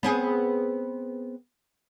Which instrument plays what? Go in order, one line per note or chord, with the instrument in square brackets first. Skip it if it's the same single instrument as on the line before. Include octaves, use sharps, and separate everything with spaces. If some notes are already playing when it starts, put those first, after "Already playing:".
[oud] B3 C4 G#4